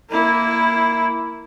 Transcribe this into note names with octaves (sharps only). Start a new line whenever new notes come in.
A#3 E4